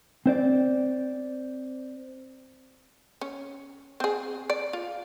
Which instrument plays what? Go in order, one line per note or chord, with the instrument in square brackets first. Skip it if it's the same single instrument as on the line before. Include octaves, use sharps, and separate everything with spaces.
[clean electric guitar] C4 C5 D5
[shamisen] C#4
C4 G#4
D5
F4